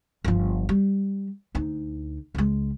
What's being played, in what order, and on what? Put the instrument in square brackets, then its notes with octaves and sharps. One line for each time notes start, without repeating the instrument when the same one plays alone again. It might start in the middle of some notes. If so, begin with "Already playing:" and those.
[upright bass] G1 F3
G3
D2 D#4
C#2 G#3